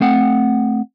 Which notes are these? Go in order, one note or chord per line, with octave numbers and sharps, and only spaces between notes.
A3 C4 F#5